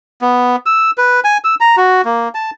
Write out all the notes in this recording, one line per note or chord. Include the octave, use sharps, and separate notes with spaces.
B3
E6
B4
G#5
E6
A#5
F#4
A#3
A5